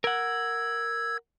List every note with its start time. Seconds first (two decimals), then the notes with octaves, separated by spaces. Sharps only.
0.04 A#4 F#5 E6 G#6